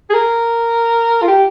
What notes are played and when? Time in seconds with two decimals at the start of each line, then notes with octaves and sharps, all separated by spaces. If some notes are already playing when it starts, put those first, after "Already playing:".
0.10 G#4
0.14 A#4
1.22 F4
1.28 G4